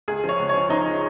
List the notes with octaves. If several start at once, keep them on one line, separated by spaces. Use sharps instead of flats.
C#2 G#4
F3
C#5
C#2
F3 C#5
F3 D#4